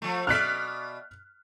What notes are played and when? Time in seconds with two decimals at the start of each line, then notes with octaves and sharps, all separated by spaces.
0.02 F3 A3
0.27 B2 D5 E5 F6 F#6 B6